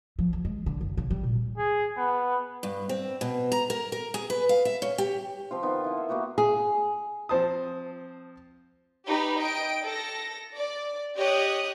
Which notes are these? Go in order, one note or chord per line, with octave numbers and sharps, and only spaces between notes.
F3
D2
G#3
D3
F#1
C#3
G3
A#2
G#4
B3
G2
C4
B2
A#5
A#4
A#4
G#4
B4
F5
E5
C#4
G4
F3 C4 F4
D#3 B3 F4
E4 F#5
E5
A#3 B3 F#4 G4
G#4
F3 C4 C5 A5 D#6
D#4 G4 B4 B5
D#5 G5 D7
A4 A#6
D5
G4 C#5 D#5 D#6 F#6